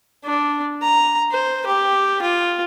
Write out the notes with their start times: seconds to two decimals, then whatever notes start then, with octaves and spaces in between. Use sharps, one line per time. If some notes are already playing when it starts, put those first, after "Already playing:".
0.25 D4
0.82 A#5
1.31 C5
1.66 G4
2.22 F4